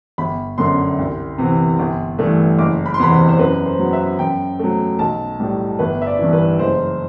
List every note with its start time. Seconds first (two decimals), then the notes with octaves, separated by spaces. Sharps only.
0.18 G1 B5
0.58 F#2 D3 C6
0.99 C2
1.38 C3 E3 B3
1.79 G1
2.19 G2 E3 A3
2.58 F#1 D6
2.86 B5
2.94 C6
2.99 E2 C3 E3 B3 B5
3.12 C5
3.29 C5
3.39 F#2 B4
3.66 C5
3.79 F#3 B3
3.93 E5
4.19 F#2 G5
4.59 F#3 A3
4.99 B1 A5
5.40 A2 G3
5.79 G1 B4
6.02 E5
6.07 D5
6.19 G2 E3
6.33 B4
6.59 F#1 C5